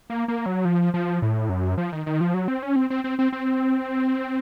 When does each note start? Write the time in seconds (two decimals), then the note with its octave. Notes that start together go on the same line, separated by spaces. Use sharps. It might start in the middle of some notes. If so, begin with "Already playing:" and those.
0.10 A#3
0.28 A#3
0.46 F#3
0.65 F3
0.94 F3
1.22 A2
1.49 F#2
1.78 F3
1.92 D#3
2.06 D#3
2.21 F3
2.34 F#3
2.48 C4
2.63 C#4
2.76 C4
2.90 C4
3.04 C4
3.19 C4
3.32 C4